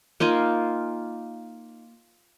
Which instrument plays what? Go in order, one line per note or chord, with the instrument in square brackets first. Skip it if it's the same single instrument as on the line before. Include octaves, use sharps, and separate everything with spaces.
[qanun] A#3 D#4 F4 G#5